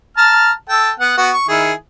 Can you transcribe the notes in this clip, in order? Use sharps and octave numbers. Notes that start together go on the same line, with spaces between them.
A5 A#5 F6
A4 G5 A5
B3 F#5
B3 F#4
C#6
D#3 E4 G#4